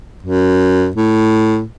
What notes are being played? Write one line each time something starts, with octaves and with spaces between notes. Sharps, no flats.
F#2
A2